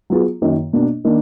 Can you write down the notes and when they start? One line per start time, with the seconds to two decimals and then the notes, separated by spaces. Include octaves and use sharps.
0.10 F#3 B3 F4 G#4
0.42 F#2 D#3 A#3
0.73 B2 A#3 D4
1.04 D#3 A#3 D4